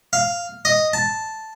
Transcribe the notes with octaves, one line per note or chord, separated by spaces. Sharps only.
F5
D#5
A5